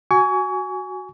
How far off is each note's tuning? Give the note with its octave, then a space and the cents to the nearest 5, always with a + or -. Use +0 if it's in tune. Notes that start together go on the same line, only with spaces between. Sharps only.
F#4 +0 G#5 +0 C#6 +35